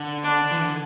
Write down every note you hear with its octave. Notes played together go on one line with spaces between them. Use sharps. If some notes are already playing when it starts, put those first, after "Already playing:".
Already playing: D3
D4
E3
D3